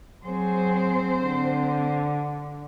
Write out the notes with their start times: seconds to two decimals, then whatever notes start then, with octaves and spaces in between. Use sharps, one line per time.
0.24 F#3 C4 G#4 C5
1.20 D3